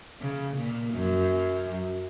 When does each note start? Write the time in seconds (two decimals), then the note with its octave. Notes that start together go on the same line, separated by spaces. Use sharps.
0.21 C#3
0.57 A#2
0.94 F#2